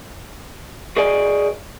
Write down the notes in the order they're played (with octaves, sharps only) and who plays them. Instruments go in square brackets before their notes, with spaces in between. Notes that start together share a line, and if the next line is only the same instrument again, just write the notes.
[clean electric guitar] F#4 G#4 B4 D5 D#5 G#5